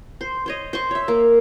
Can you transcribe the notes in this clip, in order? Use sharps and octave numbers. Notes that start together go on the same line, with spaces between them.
C5
C5 C#5 D#5
C5 C#6
C#5 E5
A#3